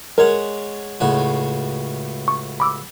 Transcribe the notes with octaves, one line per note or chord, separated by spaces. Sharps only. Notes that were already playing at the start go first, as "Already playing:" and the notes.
G#3 A#4 C#5 F#5
C#2 A2 F#4
C#6
B5 D6 E6